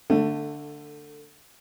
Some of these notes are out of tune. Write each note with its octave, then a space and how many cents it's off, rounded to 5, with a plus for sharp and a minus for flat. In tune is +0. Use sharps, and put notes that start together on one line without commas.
D3 +0 A3 +20